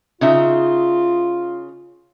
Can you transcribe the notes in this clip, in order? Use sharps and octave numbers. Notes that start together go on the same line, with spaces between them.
C#3 D#4 F4 E5